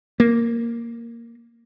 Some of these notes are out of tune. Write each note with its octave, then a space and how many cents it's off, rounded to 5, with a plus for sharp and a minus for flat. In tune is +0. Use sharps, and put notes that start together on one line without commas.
A#3 -5